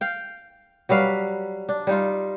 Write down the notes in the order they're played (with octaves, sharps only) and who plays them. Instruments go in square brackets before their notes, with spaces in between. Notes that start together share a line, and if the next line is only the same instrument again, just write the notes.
[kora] F5 G5
F#3 G3 B4 F5
D4
G3 D#4 F4